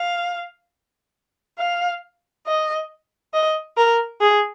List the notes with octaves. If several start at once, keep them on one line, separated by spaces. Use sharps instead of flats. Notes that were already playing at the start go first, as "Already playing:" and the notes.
Already playing: F5
F5
D#5
D#5
A#4
G#4